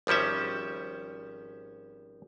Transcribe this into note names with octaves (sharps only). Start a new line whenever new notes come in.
G#1 F3 G3 C#4 E5